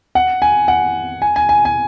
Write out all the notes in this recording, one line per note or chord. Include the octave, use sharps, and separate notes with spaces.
F#5
G#5
F#5
G#5
G#5
G#5
G#5